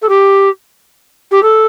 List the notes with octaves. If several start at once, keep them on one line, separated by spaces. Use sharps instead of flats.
A4
G4
G4
A4